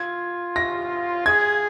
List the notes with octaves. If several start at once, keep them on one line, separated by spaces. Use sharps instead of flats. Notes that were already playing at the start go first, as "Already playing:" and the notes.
Already playing: F4 G#6
A#6
G#4 G#6